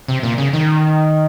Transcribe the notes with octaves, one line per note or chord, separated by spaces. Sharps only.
C3
A#2
C#3
D#3